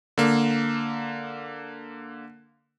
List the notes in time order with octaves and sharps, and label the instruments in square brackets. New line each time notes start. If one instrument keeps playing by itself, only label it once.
[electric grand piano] D3 A#3